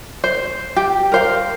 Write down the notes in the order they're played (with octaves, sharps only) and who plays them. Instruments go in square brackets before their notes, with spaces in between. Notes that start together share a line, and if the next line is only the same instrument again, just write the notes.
[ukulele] C5
G4
A#4 C5 F5